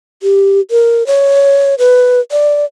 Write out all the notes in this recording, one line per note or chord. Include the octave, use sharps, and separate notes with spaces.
G4
A#4
C#5
B4
D5